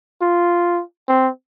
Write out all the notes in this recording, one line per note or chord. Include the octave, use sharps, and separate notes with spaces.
F4
C4